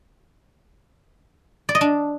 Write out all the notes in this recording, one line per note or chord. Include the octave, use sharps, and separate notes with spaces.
D5
D#5
D4